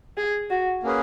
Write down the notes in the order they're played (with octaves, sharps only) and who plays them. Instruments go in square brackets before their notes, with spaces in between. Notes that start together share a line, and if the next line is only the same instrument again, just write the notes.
[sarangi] G#4
F#4
[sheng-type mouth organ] A#3 C#4 G#4 B4